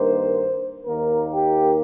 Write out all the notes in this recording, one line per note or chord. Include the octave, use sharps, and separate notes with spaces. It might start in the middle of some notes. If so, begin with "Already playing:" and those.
Already playing: G2 D#3 A#3 C5
D#2 D#3 A#3 A#4
G4